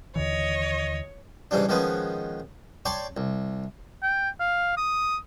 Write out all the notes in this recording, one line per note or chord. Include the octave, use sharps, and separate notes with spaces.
D#2 D3 E3 C#5 D#5
G#2 C#3 E3 G3 D4
D#3 F3 G#3 B3 C#4 B4
C#5 D5 G5 A5 C6 D6
C2
G5
F5
D#6